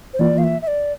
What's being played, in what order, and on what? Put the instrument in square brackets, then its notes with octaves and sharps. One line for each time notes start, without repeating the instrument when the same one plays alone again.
[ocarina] C5
[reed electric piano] E3 A#3 F4 [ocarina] D5
[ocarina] F5
E5
E5
D5